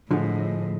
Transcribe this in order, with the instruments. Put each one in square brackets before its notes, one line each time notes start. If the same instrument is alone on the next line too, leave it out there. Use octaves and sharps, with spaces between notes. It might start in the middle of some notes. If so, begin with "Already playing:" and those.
[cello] A2 [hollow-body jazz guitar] D3 F3 G#3